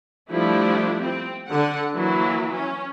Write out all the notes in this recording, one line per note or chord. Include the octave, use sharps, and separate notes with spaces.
F3 G3 A3 D4 E4
C4
D3 F#5
E3 F#3 A#3 E4
C#4